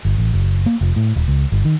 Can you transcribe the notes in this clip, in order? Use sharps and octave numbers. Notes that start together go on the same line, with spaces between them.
G1
A1
F#1
A#3
F1
A2
D#1
C#2
G1
D#3